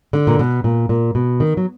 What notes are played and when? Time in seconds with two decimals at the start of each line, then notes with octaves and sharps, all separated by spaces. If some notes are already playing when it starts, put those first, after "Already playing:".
0.13 D3
0.27 A#2
0.39 B2
0.64 A#2
0.89 A#2
1.15 B2
1.40 D#3
1.57 F#3